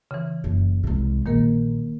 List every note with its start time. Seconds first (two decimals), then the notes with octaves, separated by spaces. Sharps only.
0.11 C#3 E3
0.44 F#1
0.84 C2 G#3
1.26 A#1 D#3 A#3 A#4